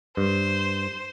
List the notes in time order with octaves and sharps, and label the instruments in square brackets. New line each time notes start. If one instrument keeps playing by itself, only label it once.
[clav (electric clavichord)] G2 [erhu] C5